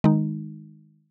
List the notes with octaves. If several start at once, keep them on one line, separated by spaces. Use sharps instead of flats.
D#3 G#3 D#4